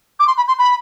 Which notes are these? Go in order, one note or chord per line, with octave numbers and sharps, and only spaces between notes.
D6
C6
B5
C6
B5